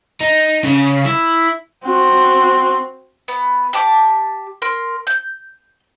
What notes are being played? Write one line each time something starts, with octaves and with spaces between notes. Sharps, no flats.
D#4
C#3
E4
C4 F#4
B3
G4 A5 D6
A#4 C6 F6
G6